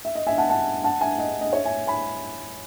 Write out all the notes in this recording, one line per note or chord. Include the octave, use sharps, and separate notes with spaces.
E5
D#5
E5 G#5
F#5 A5
F#5 A5
F#5 A5
E5 G#5
D#5 F#5
D#5
C#5 E5
E5 G#5
G#5 B5